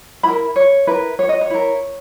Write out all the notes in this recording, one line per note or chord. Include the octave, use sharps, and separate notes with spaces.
E4 A#4 B5
C#5
E4 A#4 B4
C#5
D#5
C#5
E4 A#4